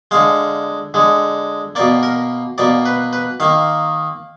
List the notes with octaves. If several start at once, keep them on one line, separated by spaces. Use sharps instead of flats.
D3 G#3 F5
D3 G#3
B2 A#3 D5
A#4
B2 A#3 D5
B4
B4
D#3 A#3 F5